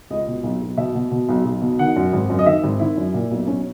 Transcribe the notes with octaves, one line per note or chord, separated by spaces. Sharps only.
C#2 D#5
B2
B1
B1
B2 E5
B2
B2
B1
B1
B2
D#3 F#5
F#2
G#1
F#2
D#5
D#3 E5
G#1
D#3 E4
F#2
A#2
B1
B1 C#4